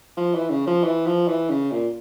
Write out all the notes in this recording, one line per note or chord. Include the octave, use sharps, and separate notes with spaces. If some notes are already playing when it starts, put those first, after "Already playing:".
F3
E3
C#3
F3
E3
F3
E3
C#3
A#2